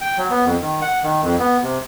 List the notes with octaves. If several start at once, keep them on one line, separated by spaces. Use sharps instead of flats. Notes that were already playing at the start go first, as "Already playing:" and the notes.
G5
F#3
B3
F2
D#3
F#5
D#3
F2
B3
C3